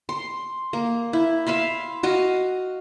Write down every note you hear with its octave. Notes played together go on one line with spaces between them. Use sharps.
C6
A#3
E4
E5 F5 B5 C6
F#4 D#5 F5